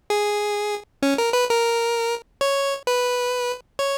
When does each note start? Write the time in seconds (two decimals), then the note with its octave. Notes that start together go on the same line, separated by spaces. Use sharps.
0.10 G#4
1.03 C#4
1.18 A#4
1.33 B4
1.49 A#4
2.41 C#5
2.87 B4
3.79 C#5